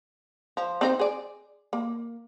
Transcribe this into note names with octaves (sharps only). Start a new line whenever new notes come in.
F3
C4 D#4 C5
G#4 D5
A#3